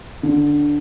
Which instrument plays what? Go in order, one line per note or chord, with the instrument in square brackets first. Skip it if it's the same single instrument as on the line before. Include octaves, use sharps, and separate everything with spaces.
[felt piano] D3